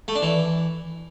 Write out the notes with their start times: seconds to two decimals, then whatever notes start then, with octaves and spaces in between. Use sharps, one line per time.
0.08 A3
0.15 D4
0.23 E3